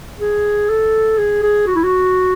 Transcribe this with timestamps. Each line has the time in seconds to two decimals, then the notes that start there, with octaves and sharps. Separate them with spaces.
0.19 G#4
0.69 A4
1.18 G#4
1.43 G#4
1.67 F#4
1.75 E4
1.84 F#4